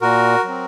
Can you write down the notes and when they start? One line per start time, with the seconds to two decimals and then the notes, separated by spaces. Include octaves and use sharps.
0.01 A#2 F#4 A#4
0.44 F#3 C4